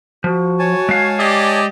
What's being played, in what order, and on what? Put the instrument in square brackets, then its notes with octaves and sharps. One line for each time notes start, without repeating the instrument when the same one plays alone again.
[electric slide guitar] F3 [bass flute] F#4
[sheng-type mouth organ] C#5 G#5 A5
[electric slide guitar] G#3 F5
[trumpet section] G4 D5 D#5